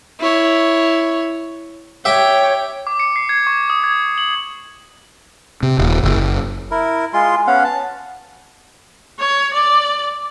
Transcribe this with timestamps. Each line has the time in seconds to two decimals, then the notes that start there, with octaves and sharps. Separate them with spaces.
0.20 E4 C#5
2.05 G4 C#5 E5 G5
2.87 D6
3.00 C#7
3.16 C7
3.29 G#6
3.47 C#6
3.70 D#6
3.84 G#6
4.18 F#7
5.63 C3
5.79 D#1
6.03 F#1
6.71 E4 A#4
7.14 G#3 F4 C6
7.47 B3 C#4 F5 F#5
7.64 A5
9.19 C#5
9.53 D5